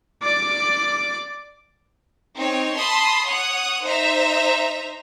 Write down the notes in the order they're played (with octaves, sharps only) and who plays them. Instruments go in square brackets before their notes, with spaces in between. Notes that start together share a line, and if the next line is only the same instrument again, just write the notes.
[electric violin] D5 D6
[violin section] C4 D#4 C#5
A5 B5 C6 D#6
C#5 F#5 D#6
D#4 C5 E5 A#5